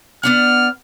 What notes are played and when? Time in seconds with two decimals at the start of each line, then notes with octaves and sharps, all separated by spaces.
0.23 B3 D4 F#5 F6